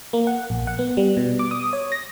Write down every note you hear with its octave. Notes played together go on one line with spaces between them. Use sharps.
A#3
F#5
A#1
F#5
B3
G3
B2
D6
D#6
C#5
A#6